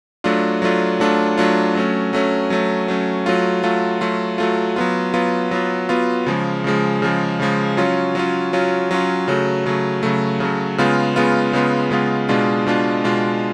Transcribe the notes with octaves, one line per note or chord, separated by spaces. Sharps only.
F#3 A3 D4 F4
F#3 A3 D4 F4
F#3 A3 D4 F4
F#3 A3 D4 F4
F#3 A3 C#4
F#3 A3 C#4
F#3 A3 C#4
F#3 A3 C#4
F#3 A3 F4
F#3 A3 F4
F#3 A3 F4
F#3 A3 F4
F#3 B3 F4
F#3 B3 F4
F#3 B3 F4
F#3 B3 F4
C#3 F3 G#3
C#3 F3 G#3
C#3 F3 G#3
C#3 F3 G#3
F#3 C#4 F4
F#3 C#4 F4
F#3 C#4 F4
F#3 C#4 F4
C#3 F#3 A3
C#3 F#3 A3
C#3 F#3 A3
C#3 F#3 A3
C#3 G#3 B3 F4
C#3 G#3 B3 F4
C#3 G#3 B3 F4
C#3 G#3 B3 F4
B2 G#3 D4 F4
B2 G#3 D4 F4
B2 G#3 D4 F4